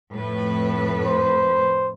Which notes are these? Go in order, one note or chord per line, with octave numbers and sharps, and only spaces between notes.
F2 A2 B4
C5